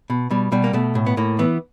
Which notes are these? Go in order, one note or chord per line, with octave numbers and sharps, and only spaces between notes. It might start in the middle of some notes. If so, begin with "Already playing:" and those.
B2
B2 G3
B2 G3
A#3
B2 A3
A2
B3
A2 A#3
E3 B3